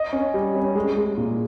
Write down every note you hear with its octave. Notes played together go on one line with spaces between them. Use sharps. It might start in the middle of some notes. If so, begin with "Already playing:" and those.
Already playing: D#5
C#4
G3
C#4
G#3
G#3
A#2